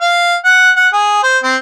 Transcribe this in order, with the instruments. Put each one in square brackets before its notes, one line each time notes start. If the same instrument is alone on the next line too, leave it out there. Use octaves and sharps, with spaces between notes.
[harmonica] F5
F#5
F#5
G#4
C5
C4